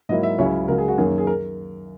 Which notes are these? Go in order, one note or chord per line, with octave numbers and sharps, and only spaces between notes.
G#2 F#3 A#3 E4 D#5
E5
C#2 C#3 F#3 C#4 E4 C#5
C#2 C#3 F#3 A#4
G#4
F#4
F#2 D#3 A#3 C#4 G#4
G#4
A#4